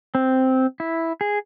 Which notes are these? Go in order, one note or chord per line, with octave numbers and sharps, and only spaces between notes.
C4
E4
G#4